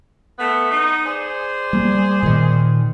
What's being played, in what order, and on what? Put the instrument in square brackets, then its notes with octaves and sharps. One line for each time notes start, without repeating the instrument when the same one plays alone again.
[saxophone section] A3 B3
D#4
G#4 C5 D5
[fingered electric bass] G3 A#3
A#2 D#3